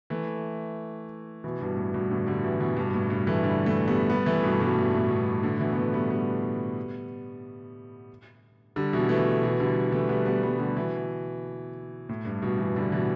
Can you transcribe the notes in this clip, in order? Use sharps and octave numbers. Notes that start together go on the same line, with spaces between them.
E3 A3
B2 E3
G2 B2
A2
G2 B2
A2 D3
D3 G3
B2 E3
B2 E3
G2 B2
A2
G2
E3 A3
D3 G3
E3 A3
G3 B3
G3 B3
E3 A3
G2 B2
G2 B2
A2
A2
G2 B2
A2 D3
B2 E3
B3
E3 A3
G3 B3
G3 B3
D3 G3
B2 E3
E3 A3
B2 E3
D3 G3
E3 A3
G3 B3
G3 B3
G3 B3
D3 G3
B2 E3
A2
G2
G2 B2
B2 E3
D3 G3
B2 E3